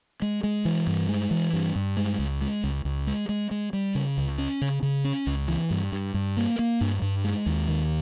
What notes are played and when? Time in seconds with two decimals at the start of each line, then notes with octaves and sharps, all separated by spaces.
0.22 G#3
0.44 G#3
0.65 E3
0.87 G2
1.09 G#3
1.31 E3
1.53 G2
1.76 G2
1.97 G#3
2.19 C#2
2.41 G#3
2.64 C#2
2.85 C#2
3.07 G#3
3.29 G#3
3.51 G#3
3.73 G3
3.95 C#3
4.17 C#2
4.38 C#4
4.61 C#3
4.82 C#3
5.04 C#4
5.27 C#2
5.48 E3
5.71 G2
5.92 G2
6.14 G2
6.37 A#3
6.59 A#3
6.81 G2
7.02 G2
7.24 G#3
7.46 D#2
7.68 D#3